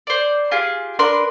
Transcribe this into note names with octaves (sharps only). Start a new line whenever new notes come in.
C5 D5
F4 G4 G#4
D4 A#4 B4 C6